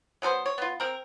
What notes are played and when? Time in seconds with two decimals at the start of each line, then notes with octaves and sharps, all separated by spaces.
0.22 F#3 B3 A4 C5
0.46 C#5
0.58 B3 F4
0.80 C4 A#4